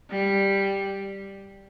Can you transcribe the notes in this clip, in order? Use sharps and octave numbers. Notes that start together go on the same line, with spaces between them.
G3